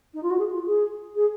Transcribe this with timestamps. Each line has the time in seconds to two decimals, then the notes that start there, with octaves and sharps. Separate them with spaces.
0.14 D#4
0.23 F4
0.31 F#4
0.39 G#4
0.54 F4
0.67 G#4
1.16 G#4